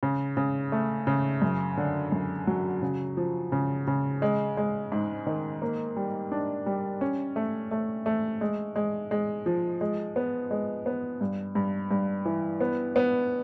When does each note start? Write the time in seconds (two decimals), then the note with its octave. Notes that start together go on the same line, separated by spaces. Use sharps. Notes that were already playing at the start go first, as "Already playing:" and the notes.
0.03 C#3
0.37 C#3
0.72 A3
1.07 C#3
1.42 F#2
1.77 D3
2.12 F#2
2.47 F#3
2.82 C#3
3.17 F3
3.52 C#3
3.87 C#3
4.22 G#3
4.57 G#3
4.92 G#2
5.27 D#3
5.62 A#3
5.97 G3
6.32 D4
6.66 G3
7.01 C#4
7.36 A3
7.71 A3
8.06 A3
8.41 G#3
8.76 G#3
9.11 G#3
9.46 F3
9.81 G#3
10.16 B3
10.51 G#3
10.86 B3
11.21 G2
11.55 G2
11.91 G2
12.25 E3
12.60 B3
12.96 B3